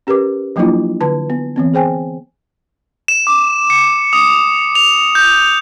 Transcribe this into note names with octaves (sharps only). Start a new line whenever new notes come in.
C#4 G4 A#4 B4 D6
F3 F#3 A#3 D4 E4 F4
D3 B4 A5
B3
E3 B3 C4
G#4 C5 G5 G#5
E7
D6
C#7
D#6
F7
G6